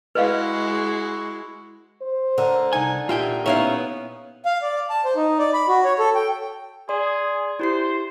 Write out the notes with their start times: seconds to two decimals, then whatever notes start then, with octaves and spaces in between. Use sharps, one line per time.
0.15 G#3 E4 F#4 B4 D#5 F5
2.02 C5
2.38 D3 A#4
2.73 C2 D#4 G#5
3.09 A#2 F4 G4 D#5 E5 G5 G#5
3.46 B3 C#4 D#4 E4 C#5 E5 F5
4.45 F5
4.62 D5
4.90 A5
5.05 C5
5.16 D#4
5.39 D5
5.53 B5
5.68 F#4
5.84 C#5
5.99 A4
6.15 G5
6.89 G#4 D5 C6
7.59 E4 G4 C5 C7